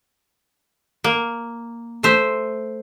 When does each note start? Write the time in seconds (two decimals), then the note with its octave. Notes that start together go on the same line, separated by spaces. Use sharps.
1.04 A#3
2.03 A3 C5 E5